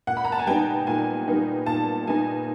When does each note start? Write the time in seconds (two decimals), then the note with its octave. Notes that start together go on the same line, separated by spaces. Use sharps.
0.07 A#2 F#5
0.17 B5
0.25 A#5
0.32 A5
0.39 G#5
0.47 G3 B3 D#4 G5
0.87 A#2 G#5
1.28 G3 B3 D#4
1.66 A#2 A5
2.07 G3 B3 D#4 G#5